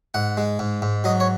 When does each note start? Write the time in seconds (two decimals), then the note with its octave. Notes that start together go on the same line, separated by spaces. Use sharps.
0.14 G#2 F#5
0.37 G#3
0.59 G#2
0.82 G#2
1.04 F#3 D#5
1.20 C#5